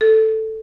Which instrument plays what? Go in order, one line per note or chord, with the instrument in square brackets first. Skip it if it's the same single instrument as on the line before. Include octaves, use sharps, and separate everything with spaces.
[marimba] A4